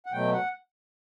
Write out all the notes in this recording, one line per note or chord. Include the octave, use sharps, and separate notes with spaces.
F#5
B2 F#3 A3 G5
F#5